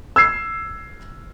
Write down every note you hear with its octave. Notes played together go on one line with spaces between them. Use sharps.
E6 G#6 C7